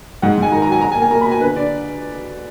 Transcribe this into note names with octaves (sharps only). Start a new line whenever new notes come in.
G#2 F#5
G#2 G#5
D#3 A#5
A#5
F#3 G#5
B2 A#5
G#5
A#3
G#5
A#3 A#5
B5
B2
G#5
D3 B4
D3 D5